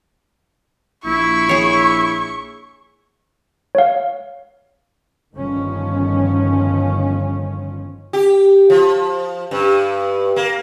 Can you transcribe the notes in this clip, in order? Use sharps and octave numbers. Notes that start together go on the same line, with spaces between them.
A#1 E4 C#6
G#4 C#5
C#5 F5
G1 D#3 F3 C#4
G4
F3
G2
A#3